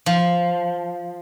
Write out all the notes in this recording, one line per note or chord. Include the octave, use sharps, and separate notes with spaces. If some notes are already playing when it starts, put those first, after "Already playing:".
F3